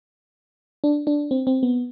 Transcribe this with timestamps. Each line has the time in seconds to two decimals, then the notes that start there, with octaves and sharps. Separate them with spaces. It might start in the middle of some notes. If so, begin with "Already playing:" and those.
0.84 D4
1.07 D4
1.31 C4
1.47 C4
1.63 B3